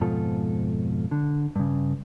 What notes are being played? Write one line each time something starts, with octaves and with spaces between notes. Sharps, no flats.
F2 G#2 B2 F4 A4
D3
G2 C#3